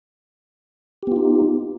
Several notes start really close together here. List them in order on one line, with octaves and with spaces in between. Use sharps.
G4 B3 F4 D#4